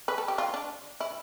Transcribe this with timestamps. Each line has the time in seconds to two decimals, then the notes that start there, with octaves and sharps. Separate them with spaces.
0.08 B4
0.18 A4
0.28 G4
0.38 F4
0.54 D4
1.00 E4